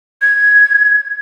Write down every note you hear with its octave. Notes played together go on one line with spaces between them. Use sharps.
G#6